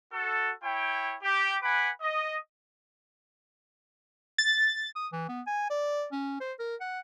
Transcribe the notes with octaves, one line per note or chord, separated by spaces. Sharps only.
F#4 A4
E4 C#5 G5
G4
B4 F#5 G#5 B5 D6
D#5
A6
D#6
E3
B3
G#5
D5
C#4
C5
A#4
F#5